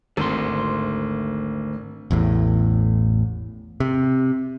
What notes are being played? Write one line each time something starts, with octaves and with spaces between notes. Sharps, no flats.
G#1 D2 C6
A1 E2 A2
C3